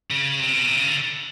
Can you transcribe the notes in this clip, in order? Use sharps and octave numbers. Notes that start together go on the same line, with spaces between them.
C#3
C3
B2
C3
C#3
D3